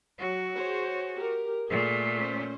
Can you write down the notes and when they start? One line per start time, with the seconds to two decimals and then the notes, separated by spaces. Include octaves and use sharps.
0.19 F#3 F#4
0.56 G#4 C5 C#5
1.14 G4 A#4
1.70 A#2 A3 G#4
2.20 C#4 C5